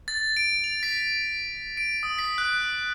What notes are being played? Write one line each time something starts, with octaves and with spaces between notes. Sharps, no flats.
A6
D7
F7
B6
D7
D#6
B6
F#6